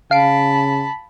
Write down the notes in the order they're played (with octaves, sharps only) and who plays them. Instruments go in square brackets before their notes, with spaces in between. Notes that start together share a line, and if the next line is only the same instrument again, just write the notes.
[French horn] C#3 [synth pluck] F5 C7 D7 [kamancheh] A5 B5